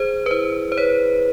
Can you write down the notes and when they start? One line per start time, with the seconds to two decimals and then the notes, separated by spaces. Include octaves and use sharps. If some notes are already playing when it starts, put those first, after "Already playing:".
Already playing: G#4 C5
0.26 B4
0.30 E4 C5
0.72 C5
0.77 B4 C#5